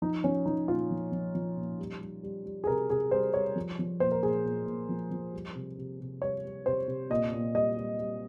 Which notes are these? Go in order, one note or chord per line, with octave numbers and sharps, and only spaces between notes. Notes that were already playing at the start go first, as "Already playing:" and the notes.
F3 D#4
F3 C#4
F3 D#4
A#2 F4
F3
F3
F3
A#2
G3
G3
G3
G3
G#4
C3 A#4
C3 G#4
G3 C5
G3 C#5
F3
F3
A#2 C5
A#4
A#2 G#4
A#2
A#2
F3
F3
G3
C3
C3
C3
G3 C#5
G3
C3 C5
C3
A#2 D#5
A#2
G3 D#5
G3
G3